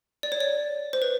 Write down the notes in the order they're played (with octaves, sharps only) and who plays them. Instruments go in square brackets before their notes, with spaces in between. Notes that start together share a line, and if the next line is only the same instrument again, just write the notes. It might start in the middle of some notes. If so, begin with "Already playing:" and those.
[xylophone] D5
C#5
D5
C5
B4